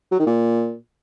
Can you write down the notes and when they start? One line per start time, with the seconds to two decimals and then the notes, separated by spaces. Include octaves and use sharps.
0.11 F#3
0.19 D#3
0.26 A#2